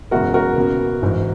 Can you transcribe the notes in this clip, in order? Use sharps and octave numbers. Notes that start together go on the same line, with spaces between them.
F#1 E2 B2 G#3 F#4 A#4
F#4 A#4
C#2 B2 A#3
A#1 G#2 E3